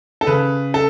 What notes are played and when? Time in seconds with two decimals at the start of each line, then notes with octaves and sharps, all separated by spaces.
0.21 A4
0.27 C#3 B4
0.74 A4